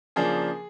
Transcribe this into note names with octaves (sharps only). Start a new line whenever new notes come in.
C#3 F3 A#3 D4 G#4